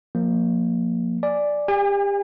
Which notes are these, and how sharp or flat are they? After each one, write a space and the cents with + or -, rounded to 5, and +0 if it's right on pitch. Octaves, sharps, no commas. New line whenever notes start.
F3 +25 A#3 +0
D5 +0 G#5 +0
G4 +30 G#5 -40